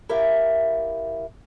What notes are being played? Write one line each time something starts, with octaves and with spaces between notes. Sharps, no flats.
E4 G4 A#4 C#5 E5 F5